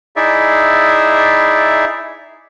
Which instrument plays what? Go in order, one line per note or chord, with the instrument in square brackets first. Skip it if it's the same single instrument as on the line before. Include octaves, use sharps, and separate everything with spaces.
[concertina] D#4 E4 G#4 D5 E5